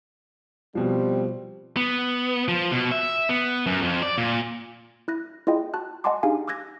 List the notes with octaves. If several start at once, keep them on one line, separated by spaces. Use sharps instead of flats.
B2 F3 G3 C4
B3
F3
B2
E5
B3
F#2
F2
D5
A#2
E4 F#6 A#6
E4 F4 G#4 D#5 G5
F#4 A5 F#6
D#5 F#5 G#5 A5 C6 D6
D4 D#4 G4 G#4 F5 G#5
D6 E6 F#6 G#6 A#6